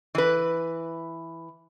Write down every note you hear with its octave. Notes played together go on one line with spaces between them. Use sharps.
E3 B4